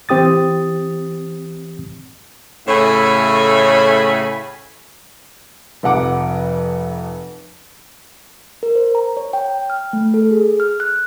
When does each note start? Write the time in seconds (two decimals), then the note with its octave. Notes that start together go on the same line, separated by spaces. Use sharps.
0.09 E3 C4 G4 D#6 A6
2.68 A2 C#3 A3 C#5 G#5 B5
5.83 F1 F2 F#5 D6
8.63 A#4
8.75 C5
8.95 A#5
9.17 C#5
9.33 G5
9.70 F6
9.93 A3
10.14 A4
10.31 G#4
10.60 F6
10.80 F#6